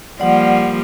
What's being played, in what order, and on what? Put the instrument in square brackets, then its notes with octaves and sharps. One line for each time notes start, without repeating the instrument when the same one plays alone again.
[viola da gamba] F3 G3 A#3 [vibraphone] D5 F#5